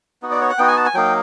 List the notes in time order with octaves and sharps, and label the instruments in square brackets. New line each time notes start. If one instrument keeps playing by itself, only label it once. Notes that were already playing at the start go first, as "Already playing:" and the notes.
[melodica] B3 D#4 F#4
D5
C#5
F#5
B3 D#4 F#4 G5
G#5
A5
G#5
F#3 A#3 D#4 G5